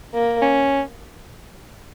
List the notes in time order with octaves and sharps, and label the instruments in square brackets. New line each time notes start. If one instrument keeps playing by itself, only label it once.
[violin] A#3
[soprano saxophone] C#4